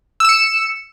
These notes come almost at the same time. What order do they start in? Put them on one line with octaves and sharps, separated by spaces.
E6 E7 C#7